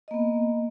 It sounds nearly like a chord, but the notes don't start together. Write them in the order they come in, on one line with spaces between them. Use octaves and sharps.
D#5 A#3 B3